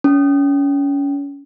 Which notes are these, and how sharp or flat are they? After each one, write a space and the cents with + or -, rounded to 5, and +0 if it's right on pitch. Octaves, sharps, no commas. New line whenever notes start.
C#4 +25